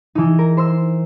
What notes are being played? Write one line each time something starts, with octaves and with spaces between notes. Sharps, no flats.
E3 D#4
A#4
C5 C6 E6